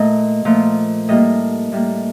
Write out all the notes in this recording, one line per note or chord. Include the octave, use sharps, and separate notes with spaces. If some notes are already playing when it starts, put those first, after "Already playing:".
Already playing: A#2 A3 D#5
A#2 F3 A3
A2 G3 A#3 D#5
A2 G3 A#3